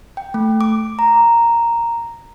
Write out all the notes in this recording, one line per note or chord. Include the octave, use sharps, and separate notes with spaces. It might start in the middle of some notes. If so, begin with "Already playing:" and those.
G5
A3
D6
A#5